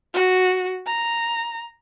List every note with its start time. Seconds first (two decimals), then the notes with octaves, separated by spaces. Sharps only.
0.14 F#4
0.87 A#5